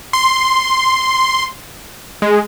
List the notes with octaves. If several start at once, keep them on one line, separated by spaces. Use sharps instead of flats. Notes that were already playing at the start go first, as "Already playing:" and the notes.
C6
G#3